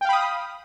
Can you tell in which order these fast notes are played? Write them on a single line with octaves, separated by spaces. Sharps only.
G5 F5 B5 D#6